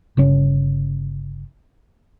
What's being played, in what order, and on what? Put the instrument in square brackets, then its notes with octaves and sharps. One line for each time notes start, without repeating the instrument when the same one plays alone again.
[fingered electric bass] G1 C#3 C#4